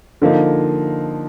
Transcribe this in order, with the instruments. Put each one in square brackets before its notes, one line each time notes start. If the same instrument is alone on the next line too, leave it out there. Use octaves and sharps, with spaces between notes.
[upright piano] D3 F3 A#3 D#4